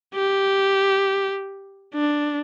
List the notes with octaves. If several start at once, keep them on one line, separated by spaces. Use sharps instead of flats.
G4
D4